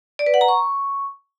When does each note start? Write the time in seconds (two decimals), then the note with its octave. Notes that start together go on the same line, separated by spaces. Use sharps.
0.19 D5
0.26 B4
0.34 F#5
0.41 A#5
0.48 C#6